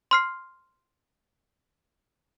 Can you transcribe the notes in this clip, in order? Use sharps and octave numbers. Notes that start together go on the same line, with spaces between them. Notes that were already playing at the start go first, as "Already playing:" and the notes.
C6 F6 C7